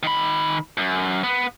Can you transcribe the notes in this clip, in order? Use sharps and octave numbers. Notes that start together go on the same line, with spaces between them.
D#3 B5
F#2
B3